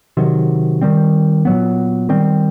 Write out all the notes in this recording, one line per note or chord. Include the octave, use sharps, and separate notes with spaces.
C3 D#3 F#3
D#3 G3 C4
A#2 F#3 B3
D#3 G3 C4